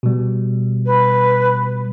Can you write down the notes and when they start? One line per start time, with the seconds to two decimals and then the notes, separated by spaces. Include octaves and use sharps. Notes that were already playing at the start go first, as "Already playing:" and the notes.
0.03 B2 G3
0.86 B4